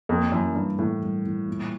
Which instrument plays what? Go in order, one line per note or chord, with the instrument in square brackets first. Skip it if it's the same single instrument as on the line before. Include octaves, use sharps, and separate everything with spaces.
[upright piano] F2 [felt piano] A#3
[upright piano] F#2 [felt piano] E3
[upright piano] G2 [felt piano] G3
[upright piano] A2 [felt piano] E3
[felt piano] G3
E3
A#2